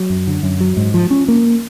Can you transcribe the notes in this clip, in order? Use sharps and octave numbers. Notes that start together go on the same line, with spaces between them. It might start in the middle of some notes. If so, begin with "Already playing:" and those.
Already playing: F#3
F#2
D3
F#2
F#3
G#2
F3
C#4
A#3